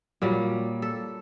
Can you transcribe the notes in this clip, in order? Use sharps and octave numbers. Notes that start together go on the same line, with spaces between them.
A#2 F#3 G3
A4